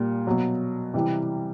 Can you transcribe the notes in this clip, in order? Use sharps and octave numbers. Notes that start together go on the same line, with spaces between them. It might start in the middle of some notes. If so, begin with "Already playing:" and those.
Already playing: A#2 G3
B2 F#3
C3 E3 G3